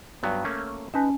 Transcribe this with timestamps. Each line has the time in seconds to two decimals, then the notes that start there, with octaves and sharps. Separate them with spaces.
0.23 G2 F#3 B3
0.44 A3 A#3 C#4
0.94 C#4 D#4 B4 G#5 A5